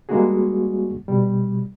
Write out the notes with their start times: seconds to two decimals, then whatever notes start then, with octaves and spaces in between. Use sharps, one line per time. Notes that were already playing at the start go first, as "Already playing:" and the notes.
0.09 G3 G#3 A#3 D4 F#4 G#4
1.08 B2 G3